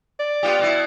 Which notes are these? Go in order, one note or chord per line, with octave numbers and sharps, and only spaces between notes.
D5
B3 F4 G4
B2 E4